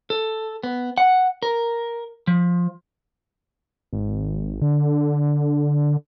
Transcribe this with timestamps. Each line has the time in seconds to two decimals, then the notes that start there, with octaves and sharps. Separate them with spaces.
0.10 A4
0.63 B3
0.98 F#5
1.43 A#4
2.27 F3
3.93 G#1
4.62 D3